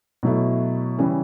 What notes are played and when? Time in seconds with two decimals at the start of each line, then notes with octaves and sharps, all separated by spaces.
0.23 B2 F#3 A3 E4
0.98 C#3 E3 G3 C#4